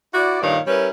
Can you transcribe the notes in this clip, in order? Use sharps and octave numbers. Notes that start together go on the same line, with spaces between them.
E4 F#4 D5
G2 A#2 D#3 C#5 F5
G3 C#4 E4 A#4 B4